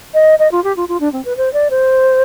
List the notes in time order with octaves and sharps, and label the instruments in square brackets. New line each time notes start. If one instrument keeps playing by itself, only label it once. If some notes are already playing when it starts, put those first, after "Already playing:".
[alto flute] D#5
D#5
F4
G4
F4
F4
D4
C4
B4
C5
D5
C5